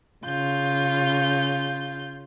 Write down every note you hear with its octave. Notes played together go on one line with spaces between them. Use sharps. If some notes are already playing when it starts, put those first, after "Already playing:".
C#3 F4 G6